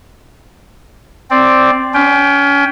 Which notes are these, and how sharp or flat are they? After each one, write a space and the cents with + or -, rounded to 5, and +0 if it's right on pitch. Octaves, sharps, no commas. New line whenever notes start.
C4 +0 D5 +0
C#4 +30 G5 +0